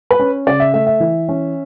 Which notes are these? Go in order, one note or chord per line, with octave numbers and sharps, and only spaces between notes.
B4
C#4
C#3 D5
E5
A3 E5
E5
E3
C#4